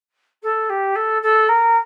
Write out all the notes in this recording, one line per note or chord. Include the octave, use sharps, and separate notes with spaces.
A4
G4
A4
A4
A#4